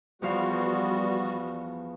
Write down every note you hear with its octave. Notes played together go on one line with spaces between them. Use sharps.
E2 F3 G3 B3 F#4 F5